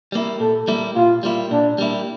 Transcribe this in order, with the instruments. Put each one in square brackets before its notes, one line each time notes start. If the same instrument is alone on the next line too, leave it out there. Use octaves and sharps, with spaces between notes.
[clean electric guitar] G3 A#3 E4
[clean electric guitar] A#2 [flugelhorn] A4
[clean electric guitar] G3 A#3 E4
[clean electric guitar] A#2 [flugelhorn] F4
[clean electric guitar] G3 A#3 E4
[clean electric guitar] A#2 [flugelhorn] D4
[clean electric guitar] G3 A#3 E4